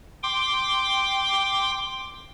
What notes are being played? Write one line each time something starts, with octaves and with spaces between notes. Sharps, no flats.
G5 C6 D6